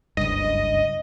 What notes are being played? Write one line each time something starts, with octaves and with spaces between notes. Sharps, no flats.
F#1 C#2 G2 D#5